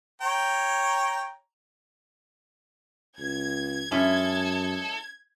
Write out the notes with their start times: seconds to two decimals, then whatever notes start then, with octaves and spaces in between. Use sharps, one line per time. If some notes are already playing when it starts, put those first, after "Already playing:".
0.21 C#5 G5 A#5
3.19 C#2 G#6
3.92 F#2 G#3 C#4 E4 A4